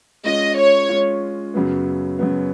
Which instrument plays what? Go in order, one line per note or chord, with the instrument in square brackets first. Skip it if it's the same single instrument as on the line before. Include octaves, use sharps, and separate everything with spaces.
[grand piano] G#3 C#4 F4 [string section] D#5
[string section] C#5
[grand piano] G#3 C#4 F4
F#2 C#3 F#3 B3
F#2 C#3 F#3 B3